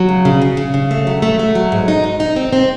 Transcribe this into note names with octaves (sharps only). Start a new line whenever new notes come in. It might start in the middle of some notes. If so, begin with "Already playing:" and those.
Already playing: F#3
C#3
C#3
C#3
C#3
C#3
A3
F#3
A3
A3
F#3
G#2
D#4
G#2
D#4
C4
C4